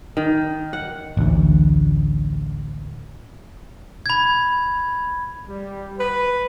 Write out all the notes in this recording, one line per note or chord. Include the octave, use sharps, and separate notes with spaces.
D#3
F#5
A1 D2
B5 G#6
G3
B4